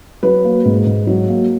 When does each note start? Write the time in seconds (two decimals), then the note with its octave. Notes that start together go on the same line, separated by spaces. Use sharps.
0.23 F#3 B4
0.44 A#3
0.65 G#2
0.86 G#2
1.07 F#3
1.29 A#3